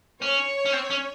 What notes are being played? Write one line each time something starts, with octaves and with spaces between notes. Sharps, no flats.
C#4 C#5
C#4
C4
C#4